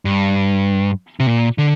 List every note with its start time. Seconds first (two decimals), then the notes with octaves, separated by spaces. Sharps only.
0.05 G2
1.20 C3
1.27 A#2
1.58 D3